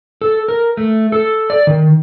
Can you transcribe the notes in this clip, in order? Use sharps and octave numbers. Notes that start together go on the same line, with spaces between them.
A4
A#4
A3
A4
D5
D#3